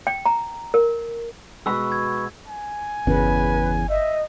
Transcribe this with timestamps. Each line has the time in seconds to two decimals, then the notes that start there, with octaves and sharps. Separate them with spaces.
0.07 G5
0.26 A#5
0.74 A#4
1.66 B2 G#3 F#4 B4 E6
1.92 G#6
2.48 G#5
3.07 G1 E2 C#3 B4
3.89 D#5 E5